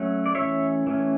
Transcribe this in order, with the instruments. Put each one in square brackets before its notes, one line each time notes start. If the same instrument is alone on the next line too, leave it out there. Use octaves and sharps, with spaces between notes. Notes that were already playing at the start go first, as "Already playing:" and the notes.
Already playing: [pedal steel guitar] F#3 A3 C#4
D5
E3 A3 C#4 C#5 E5
E3 A3 C#4